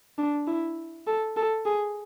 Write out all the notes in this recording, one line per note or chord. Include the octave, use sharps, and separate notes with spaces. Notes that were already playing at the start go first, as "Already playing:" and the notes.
D4
E4
A4
A4
G#4